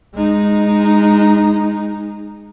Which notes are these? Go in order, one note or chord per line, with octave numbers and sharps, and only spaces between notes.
G#3 D#4